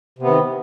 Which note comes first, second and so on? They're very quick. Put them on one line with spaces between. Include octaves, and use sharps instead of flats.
C3 B3 D#3